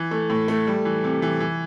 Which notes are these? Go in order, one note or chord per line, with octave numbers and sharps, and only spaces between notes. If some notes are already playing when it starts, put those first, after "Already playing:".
Already playing: E3
A3
A2
A3
G3
E3
C3
E3
E3